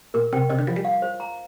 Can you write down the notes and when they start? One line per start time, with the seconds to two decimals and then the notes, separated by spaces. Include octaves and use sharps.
0.14 A#2 A#4
0.33 C3 G5
0.49 C3 D#5
0.58 D3
0.67 F3 F4
0.76 G3
0.85 F5
1.02 C5
1.20 A#5